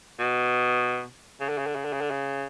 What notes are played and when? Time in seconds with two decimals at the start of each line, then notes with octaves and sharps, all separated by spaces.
0.19 B2
1.41 C#3
1.49 D3
1.58 C#3
1.67 D3
1.75 C#3
1.85 D3
1.93 C#3
2.01 D3
2.11 C#3